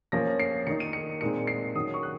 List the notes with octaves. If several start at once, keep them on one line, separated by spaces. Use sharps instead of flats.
F3 A#3 C#4 A#6
C7
D#3 A#3 D#4 C#7
D#7
C#7
A#2 G#3 C4 D#4 C#7
C7
D#3 F#3 C#4 D#6
C#6
F#6